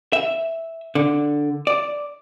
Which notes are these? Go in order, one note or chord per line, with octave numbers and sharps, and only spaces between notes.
E5
D3
D5